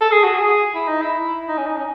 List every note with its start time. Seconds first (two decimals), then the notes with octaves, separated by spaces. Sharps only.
0.01 A4
0.12 G#4
0.24 F#4
0.35 G#4
0.75 E4
0.88 D#4
1.02 E4
1.48 D#4
1.58 C#4
1.67 D#4
1.77 C#4